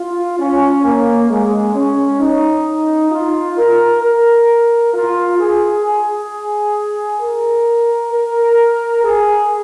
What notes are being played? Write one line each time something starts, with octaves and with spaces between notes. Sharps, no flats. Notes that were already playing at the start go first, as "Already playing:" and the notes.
Already playing: F4
C#4
A#3
G#3
C#4
D#4
F4
A#4
A#4
F4
G#4
G#4
A#4
A#4
G#4